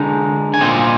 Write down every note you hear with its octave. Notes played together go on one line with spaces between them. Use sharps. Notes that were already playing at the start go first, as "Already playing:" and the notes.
Already playing: D3 G#3 D#4
G#5
A#2 G3 C4 D#5 G5